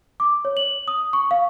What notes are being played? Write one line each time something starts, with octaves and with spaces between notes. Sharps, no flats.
D6
C#5
F#7
D#6
C#6
F5